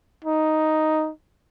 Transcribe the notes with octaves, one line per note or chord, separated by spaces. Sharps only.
D#4